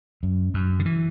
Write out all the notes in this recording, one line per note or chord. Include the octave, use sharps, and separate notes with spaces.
F#2
F#2
D3
E3